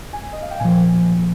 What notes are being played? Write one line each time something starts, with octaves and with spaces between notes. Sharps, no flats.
G#5
D#5
F5
G5
A#2 F3 G#5